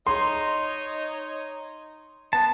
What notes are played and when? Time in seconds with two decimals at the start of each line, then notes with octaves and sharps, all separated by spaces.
0.07 D#4 C#5 D#5 C6
2.33 B3 A5